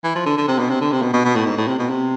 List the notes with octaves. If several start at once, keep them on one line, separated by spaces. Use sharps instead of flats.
E3
F3
D3
D3
C3
B2
C3
D3
C3
B2
B2
B2
A2
G#2
A2
C3
B2
C3